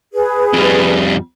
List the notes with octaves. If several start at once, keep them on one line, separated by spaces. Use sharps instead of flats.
G#4 B4
F2 G3